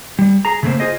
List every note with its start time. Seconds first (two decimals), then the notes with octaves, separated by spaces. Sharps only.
0.19 G3
0.45 G#4 A#5
0.63 C#3 A3 A#3 C4 C5
0.80 F4 G#4 C5 D#5